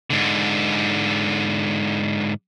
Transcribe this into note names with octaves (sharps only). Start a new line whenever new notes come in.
G#2 D3